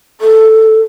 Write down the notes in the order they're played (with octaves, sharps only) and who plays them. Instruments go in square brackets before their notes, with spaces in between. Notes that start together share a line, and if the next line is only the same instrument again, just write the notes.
[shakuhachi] A4